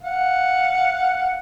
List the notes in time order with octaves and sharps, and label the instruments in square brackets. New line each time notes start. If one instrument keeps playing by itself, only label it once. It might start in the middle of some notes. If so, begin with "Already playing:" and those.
[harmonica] F5 F#5